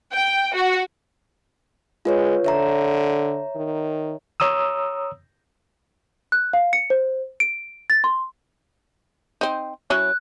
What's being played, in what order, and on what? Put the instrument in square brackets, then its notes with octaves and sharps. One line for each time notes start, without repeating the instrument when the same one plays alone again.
[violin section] G5
F#4
[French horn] G#3 [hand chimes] F4 B4 C#5
[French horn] D3 [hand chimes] C#5 E5 A#5
[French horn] D#3
[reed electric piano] C#5 A#5 D#6 E6
[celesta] F#6
F5
C#7
C5
D7
A6
C6
[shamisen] C4 D#4
[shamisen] F#3 C#4 E4 [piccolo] F#6